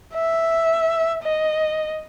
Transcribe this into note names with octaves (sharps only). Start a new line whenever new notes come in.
E5
D#5